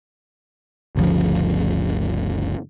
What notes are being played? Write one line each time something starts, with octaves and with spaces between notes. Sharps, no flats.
G1 D2 C#3 F3